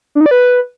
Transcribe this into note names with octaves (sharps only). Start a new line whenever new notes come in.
D4
D#4
D5
B4